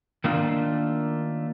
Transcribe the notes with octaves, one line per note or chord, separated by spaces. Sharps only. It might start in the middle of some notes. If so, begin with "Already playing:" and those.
D#3 A3 A#3 D4 F4